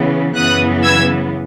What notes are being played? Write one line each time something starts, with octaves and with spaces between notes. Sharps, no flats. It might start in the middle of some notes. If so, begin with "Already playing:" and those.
Already playing: C#3 E3 B3
F#2 C#3 E3 B3 D#6 F#6
E6 G#6